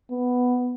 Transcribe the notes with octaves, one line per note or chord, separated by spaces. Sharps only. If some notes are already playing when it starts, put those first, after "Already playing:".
B3